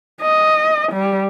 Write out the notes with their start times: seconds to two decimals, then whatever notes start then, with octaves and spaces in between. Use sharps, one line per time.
0.21 D#5
0.92 G3